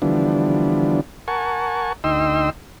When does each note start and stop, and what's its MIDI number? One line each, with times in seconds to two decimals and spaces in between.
0.02 1.01 50
0.02 1.01 52
0.02 1.01 53
0.02 1.01 55
0.02 1.01 59
0.02 1.01 62
1.28 1.93 70
1.28 1.93 78
1.28 1.93 80
1.28 1.93 81
1.28 1.93 85
2.04 2.50 38
2.04 2.50 63
2.04 2.50 75
2.04 2.50 79
2.04 2.50 84
2.04 2.50 88